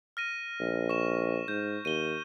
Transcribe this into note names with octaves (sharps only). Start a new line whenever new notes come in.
F6 A#6 D#7
A#1
C#6 E7
G#2 G6
D#2 D#7 G7